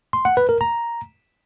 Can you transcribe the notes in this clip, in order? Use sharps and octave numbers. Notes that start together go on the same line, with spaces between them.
C6
F#5
B4
A#4
A#5